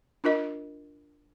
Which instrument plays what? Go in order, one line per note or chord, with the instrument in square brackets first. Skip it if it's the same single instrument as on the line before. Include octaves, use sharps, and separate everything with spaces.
[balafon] D4 F4 A#4 D#5